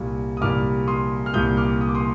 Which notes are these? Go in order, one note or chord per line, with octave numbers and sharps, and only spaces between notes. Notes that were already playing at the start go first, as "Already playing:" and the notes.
Already playing: C2 A#2 G3
D#6
C2 A#2 G3 D6 F6
C6 D#6
F6
C2 A#2 G3 D#6 G6
D6 F6
D#6
D6
C6 D#6